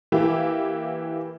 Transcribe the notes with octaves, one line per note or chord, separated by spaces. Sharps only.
E3 A#3 E4 G4